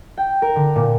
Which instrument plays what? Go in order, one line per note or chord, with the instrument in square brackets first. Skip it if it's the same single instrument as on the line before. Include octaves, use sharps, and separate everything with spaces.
[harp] G5
A#4
D3
A#2